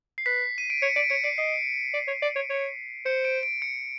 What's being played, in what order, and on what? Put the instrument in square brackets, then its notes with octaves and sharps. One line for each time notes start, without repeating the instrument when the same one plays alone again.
[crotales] C7
[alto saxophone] B4 [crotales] B6
[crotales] D#7
D7
[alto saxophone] C#5 [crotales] C#7
[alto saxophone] D5 [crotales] D7
[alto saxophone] C#5 [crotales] C#7
[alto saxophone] D5 [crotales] C7
[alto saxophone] D#5 [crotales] C7
[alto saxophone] D5
C#5
D5
C#5
C#5
[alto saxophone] C5 [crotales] C#7
[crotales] D7
D7
C#7